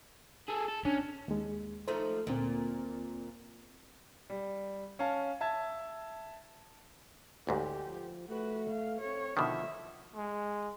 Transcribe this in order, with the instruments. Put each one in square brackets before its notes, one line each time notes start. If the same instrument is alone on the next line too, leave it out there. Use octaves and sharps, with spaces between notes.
[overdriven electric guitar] G#4 A4
A4
[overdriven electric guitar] C#4 [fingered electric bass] D4
[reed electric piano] D#2 G#3
[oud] F3 A3 D#4 [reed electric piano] C5
[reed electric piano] D2 C4 [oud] A#2 A#3
[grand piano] G3
C#4 F5 A5
E5 A5 G#6
[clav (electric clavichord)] A1 D2 G#2 [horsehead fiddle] G4
[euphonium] F3
[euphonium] A3 [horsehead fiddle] F#4 B4
[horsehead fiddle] F5
[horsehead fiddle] C4 C#5 [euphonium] A4
[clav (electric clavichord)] B2 D3 D#3 [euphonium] F3 [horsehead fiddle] E5
[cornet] G#3